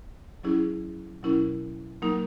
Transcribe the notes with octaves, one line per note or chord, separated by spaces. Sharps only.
F#3 C#4 E4 G#4
B2 F#3 C#4 E4 A#4
F#3 A#3 D#4 A#4